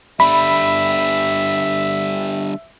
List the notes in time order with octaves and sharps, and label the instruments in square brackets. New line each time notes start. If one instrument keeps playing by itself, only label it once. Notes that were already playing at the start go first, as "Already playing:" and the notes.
[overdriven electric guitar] D3 G3 [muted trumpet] E5 [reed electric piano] B5